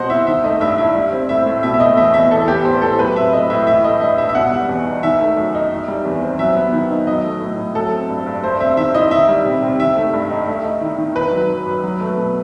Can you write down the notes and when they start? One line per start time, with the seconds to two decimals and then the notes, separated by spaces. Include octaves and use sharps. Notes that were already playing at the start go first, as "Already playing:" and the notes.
Already playing: B2 G3 C4 C5 D#5 F#5
0.10 E4 E5
0.27 D#3 E5
0.44 A3 D#5
0.61 G2 E5
0.78 E4 E5
0.95 G3
1.12 C4
1.29 A2 E5
1.46 A2
1.63 B2 E5
1.74 E5
1.80 A3 D#5
1.97 E2 E5
2.14 E2 E5
2.31 E3 A4
2.48 B3 G4
2.65 A2 C5
2.82 A2 A4
2.99 F#3 B4
3.16 C4 E5
3.33 A2 D#5
3.50 A2 E5
3.67 E3 E5
3.84 A3 D#5
4.01 G2 D#5
4.18 G2 E5
4.29 E5
4.35 B2 F#5
4.52 G3
4.69 E2
4.86 D#4
5.03 D#3 E5
5.21 A3
5.37 F#2
5.55 D#4
5.71 D#3
5.88 G3
6.05 E2
6.22 C4
6.39 F#3 E5
6.56 B3
6.73 D#3
6.91 D#4
7.07 F#3 D#5
7.25 A3
7.41 A2
7.58 A2
7.75 F#3 A4
7.92 C4
8.09 G2
8.26 G2
8.43 A3 C5
8.60 C4 E5
8.77 D#3 E5
8.94 E4 D#5
9.11 D#3 E5
9.29 G3
9.45 C3
9.62 C3
9.79 D#3 E5
9.97 A3
10.13 G2
10.30 D#4
10.47 A3
10.65 D#4
10.81 D#3
10.98 D#3
11.15 D#3 B4
11.32 F#3
11.50 F#2
11.66 F#2
11.84 F#3
12.01 A3
12.17 B2